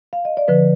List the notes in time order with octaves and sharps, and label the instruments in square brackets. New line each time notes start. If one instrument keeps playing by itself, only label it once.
[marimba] F5
D#5
D5
D3 F3 B4